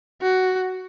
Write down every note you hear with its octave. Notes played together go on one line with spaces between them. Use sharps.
F#4